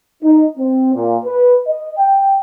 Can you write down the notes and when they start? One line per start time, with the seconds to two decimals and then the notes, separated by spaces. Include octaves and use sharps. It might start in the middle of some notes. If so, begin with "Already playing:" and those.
0.23 D#4
0.58 C4
0.95 A#2
1.25 B4
1.67 D#5
1.98 G5